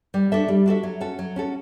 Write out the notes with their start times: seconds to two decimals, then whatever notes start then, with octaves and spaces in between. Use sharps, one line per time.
0.14 G3
0.32 D4 F#4 A4 E5
0.48 G3
0.66 D4 F#4 A4 E5
0.83 F#3
1.01 C#4 F#4 A4
1.19 F#3
1.36 C#4 F#4 A4